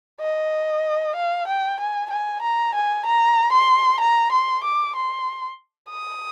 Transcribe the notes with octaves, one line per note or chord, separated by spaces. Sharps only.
D#5
F5
G5
G#5
G#5
A#5
G#5
A#5
C6
A#5
C6
D6
C6
D#6